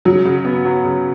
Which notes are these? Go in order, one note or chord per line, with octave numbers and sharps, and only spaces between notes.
C#3 F#3
C#3
B3
F#3
C#3